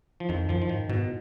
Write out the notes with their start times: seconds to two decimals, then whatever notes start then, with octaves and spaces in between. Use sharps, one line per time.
0.20 F3
0.29 F2 D#3
0.49 F#2 F3
0.62 F3
0.69 G#2 D#3
0.89 G#2 B2